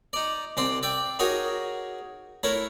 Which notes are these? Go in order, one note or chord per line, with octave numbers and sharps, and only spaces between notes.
D#4 D5
C2 C4 D5 C6
D5 E5 G5
D#4 F#4 G#4 A#4 C#5
A3 E4 A#4 C#5